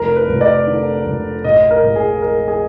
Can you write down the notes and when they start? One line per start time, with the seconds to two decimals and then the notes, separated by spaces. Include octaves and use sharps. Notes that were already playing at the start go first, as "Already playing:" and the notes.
Already playing: F1 A#4
0.16 B4
0.29 F1
0.41 D5
0.67 D3
1.06 F1
1.44 A#1 D#5
1.71 A#4
1.83 A#1
1.96 G#4
2.21 G#3 A#4
2.48 G#4